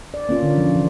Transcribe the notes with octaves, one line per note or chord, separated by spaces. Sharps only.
D5
A#3 C#4 F4
D3
F3
E3